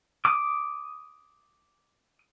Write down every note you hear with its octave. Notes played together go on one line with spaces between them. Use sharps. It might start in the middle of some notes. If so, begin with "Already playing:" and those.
D6 D#6